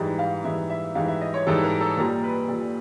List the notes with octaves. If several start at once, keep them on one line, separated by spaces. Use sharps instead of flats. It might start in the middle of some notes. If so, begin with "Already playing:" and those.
Already playing: G#2 E3 G3
F5
G#2 E3 G3 E5
E5
G#2 E3 G3 F5
E5
D#5
C#5
G#2 E3 G3 A4
A#4
A4
A#2 G3 A#4
B4
A#2 G3 A4